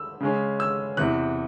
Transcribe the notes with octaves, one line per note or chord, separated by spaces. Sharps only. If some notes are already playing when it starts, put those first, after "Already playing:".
Already playing: E6
C#3 G#3 C#4
E6
E2 C3 E3 F#6